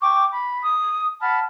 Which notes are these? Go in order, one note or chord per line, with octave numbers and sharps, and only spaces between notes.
G5 C#6 D6
B5
D#6
F#5 A5 B5 F6